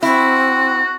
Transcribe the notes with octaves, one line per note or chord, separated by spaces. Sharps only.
C4 E4 F#4